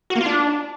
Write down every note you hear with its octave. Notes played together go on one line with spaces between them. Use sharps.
F#4
A#3
F4
D4